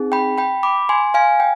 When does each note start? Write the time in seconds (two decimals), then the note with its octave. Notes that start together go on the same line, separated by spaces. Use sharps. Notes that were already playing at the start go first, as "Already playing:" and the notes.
Already playing: C4 D#4 G#4
0.12 G5 B5
0.38 G5 B5
0.63 B5 D6
0.89 G#5 C6
1.14 F5 G#5
1.40 G5